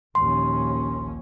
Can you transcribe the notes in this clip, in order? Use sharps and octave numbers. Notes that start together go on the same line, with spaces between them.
A#1 D#2 C#4 C6